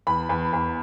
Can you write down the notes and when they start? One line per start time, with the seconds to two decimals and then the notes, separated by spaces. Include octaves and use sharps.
0.07 E2 B5
0.29 E2
0.53 E2